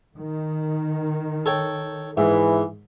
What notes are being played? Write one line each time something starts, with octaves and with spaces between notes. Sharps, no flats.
D#3
A4 C#5 G5
G#2 E3